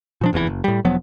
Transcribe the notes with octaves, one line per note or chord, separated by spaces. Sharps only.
A#2 F3 D4
F1 E2 A2 E3
F#1
A2 G3
E1 F3 F#3 B3